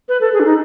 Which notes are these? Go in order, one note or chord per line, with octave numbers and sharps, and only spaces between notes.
B4
A4
G#4
D4
D#4